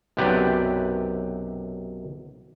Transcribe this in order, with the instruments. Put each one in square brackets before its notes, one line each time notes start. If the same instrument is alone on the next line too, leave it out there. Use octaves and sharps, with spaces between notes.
[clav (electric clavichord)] B1 F#2 C3 G4 B4 D5